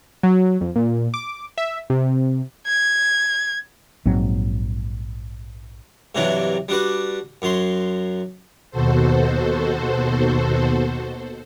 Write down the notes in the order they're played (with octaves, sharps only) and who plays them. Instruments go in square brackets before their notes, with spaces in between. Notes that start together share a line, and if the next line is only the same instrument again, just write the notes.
[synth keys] F#3
F2
A#2
D6
E5
C3
[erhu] G#6
[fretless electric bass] A#1 G#2 F#3 C4
[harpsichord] G2 C3 E3 F#3 D4 E4
G3 D4 F#4 B4
F#2 F#3 C6
[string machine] D#2 B2 F#4 A4 C5